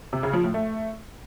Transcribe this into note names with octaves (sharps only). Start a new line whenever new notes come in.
C3
C#3
F3
A2
A3